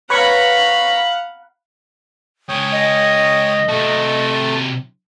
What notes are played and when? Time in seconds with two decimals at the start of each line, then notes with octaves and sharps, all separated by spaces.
0.10 B4 C#5 F5 F#5 A#5 B5 C#6
2.49 C#2 C#5 G5 D#6
2.72 D#5
3.68 C3 A3 F#4 A5